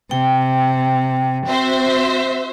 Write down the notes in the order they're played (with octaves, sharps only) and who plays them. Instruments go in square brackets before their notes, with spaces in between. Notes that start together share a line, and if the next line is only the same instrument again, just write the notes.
[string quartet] C3 [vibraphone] G5
[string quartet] C4 [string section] F#4 C5 E5